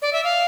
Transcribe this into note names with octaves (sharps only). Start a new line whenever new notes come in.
D5
E5
F5